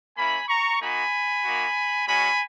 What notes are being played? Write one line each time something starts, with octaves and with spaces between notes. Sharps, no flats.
A#3 C#4 E4 G#5 B5
A#5 C#6
A#3 D#4 F#4 G#5 B5
A#3 D#4 F#4
G#3 C#4 F#4 G#5 B5